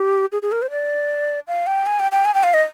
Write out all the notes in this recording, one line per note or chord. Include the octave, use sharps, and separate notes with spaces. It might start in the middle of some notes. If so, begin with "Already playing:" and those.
Already playing: G4
G#4
G#4
A#4
C5
D5
F5
G5
G#5
G5
G5
G#5
G5
F5
D#5